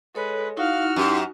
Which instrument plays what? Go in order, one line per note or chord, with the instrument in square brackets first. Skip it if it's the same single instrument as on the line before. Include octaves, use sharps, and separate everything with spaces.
[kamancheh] G#3 [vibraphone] A4 C#5 [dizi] B4
[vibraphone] D#4 E4 [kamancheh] F#4 F6 [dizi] F5
[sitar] F#2 [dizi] G4